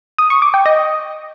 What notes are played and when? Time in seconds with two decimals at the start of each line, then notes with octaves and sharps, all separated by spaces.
0.18 D#6
0.30 C#6
0.42 D6
0.54 G5
0.66 D#5